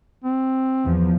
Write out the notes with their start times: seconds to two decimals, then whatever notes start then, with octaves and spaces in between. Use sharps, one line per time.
0.24 C4
0.84 E2 F3